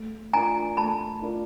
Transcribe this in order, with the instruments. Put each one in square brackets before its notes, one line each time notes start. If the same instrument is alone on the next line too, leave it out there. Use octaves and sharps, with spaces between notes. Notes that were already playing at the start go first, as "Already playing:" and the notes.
Already playing: [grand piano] A3
[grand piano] D4 F4 A#4 D5 [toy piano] G#5 A#5
[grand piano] A3 [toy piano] A5 B5
[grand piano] D4 F4 A#4 D5